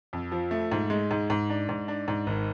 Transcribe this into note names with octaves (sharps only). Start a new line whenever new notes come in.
F2
F3
A3
G#2
G#3
G#2
G#2
D4
G#2
D4
G#2
G#1